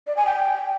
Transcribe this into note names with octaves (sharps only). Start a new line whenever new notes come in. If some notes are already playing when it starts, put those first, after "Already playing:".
D5
G#5
G5